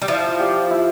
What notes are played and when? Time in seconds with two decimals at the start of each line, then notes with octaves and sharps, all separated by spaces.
0.02 G3
0.08 F3 E4
0.40 G4 D5 F5
0.71 E4